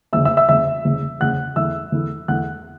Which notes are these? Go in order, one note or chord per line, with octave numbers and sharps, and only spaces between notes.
F#1 E2 C#3 E5 E6
E5 E6
E5 E6
F#1 E2 C#3 E5 E6
F#1 E2 C#3
F#1 E2 C#3 F#5 F#6
E2 E3 A3 E4 E5 E6
E2 E3 A3 E4
E2 E3 A3 E4 F#5 F#6